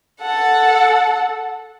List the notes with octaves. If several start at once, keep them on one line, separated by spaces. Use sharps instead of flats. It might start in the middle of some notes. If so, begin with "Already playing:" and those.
A4 F#5